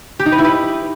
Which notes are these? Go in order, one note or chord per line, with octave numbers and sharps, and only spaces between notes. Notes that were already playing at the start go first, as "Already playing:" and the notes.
G4
D#4
B4
E4
B4